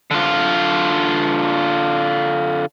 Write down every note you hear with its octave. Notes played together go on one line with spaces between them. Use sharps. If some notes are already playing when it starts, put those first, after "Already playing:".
D3 F4